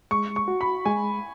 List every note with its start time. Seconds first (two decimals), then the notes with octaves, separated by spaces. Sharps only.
0.11 G#3 C#6
0.36 C#6
0.48 F#4
0.61 B5
0.85 G#3 G#5